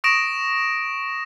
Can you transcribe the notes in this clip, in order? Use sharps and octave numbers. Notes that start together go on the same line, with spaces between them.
C#6 D#6 A#6 D7 E7